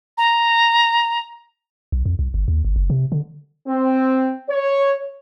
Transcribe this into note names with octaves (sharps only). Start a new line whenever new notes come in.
A#5
B1
F2
C2
G1
D#2
G1
F#1
C3
D3
C4
C#5